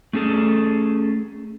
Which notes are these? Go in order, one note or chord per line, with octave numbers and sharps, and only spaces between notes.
A3 C#4 G#4 A4